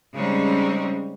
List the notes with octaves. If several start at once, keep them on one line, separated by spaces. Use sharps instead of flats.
C#3 G3 G#3 C4 C#4 D#4